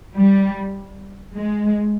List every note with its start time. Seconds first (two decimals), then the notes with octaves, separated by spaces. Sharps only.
0.15 G3
1.35 G#3